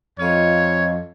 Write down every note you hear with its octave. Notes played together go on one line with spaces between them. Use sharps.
F2 F4 C#5 D#5 F5